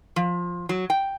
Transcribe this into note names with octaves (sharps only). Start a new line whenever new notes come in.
F3
F#3
G5